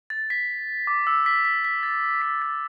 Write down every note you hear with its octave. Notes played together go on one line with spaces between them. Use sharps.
A6
B6
D6
E6
B6
B6
B6
A6
B6
A6